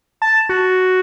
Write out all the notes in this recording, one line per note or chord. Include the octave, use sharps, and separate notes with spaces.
A5
F#4